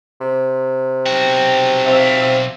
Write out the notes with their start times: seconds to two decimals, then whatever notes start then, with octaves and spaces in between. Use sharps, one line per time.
0.21 C3
1.06 B1 F#4 G5
1.86 C4 E5 F5